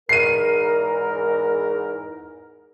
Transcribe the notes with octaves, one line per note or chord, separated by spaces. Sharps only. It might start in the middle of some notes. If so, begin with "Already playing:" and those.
E2 G#2 A#4 C7 D#7